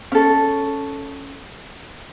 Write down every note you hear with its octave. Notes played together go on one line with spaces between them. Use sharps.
C#4 A4